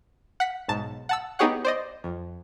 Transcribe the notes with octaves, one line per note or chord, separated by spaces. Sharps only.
F#5 B6
B1 G#2 A5
F#5 A5 E6
B3 D#4 G4 G#4 C#5 F#5
C5 D5 D#5
F2